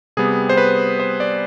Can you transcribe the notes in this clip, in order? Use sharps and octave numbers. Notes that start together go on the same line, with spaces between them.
C3 G3 B3 G#4
C5
B4
C5
D5